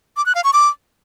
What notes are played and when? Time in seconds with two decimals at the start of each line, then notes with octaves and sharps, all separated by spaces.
0.17 D6
0.26 F#6
0.35 F5
0.44 C#6
0.53 D6